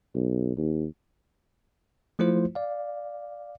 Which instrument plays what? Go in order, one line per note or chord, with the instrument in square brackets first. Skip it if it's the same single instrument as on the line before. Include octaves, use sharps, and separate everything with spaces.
[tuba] B1
D#2
[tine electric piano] F3 A3 E4 F4 C5
D5 F5